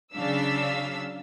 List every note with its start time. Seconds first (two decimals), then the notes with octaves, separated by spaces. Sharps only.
0.14 C#3 F#3 D4 F5 E6 B6